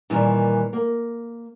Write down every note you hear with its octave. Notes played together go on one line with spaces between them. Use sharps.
A#2 D#3 E3 G3
A#3